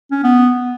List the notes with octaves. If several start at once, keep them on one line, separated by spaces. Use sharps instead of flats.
C#4
B3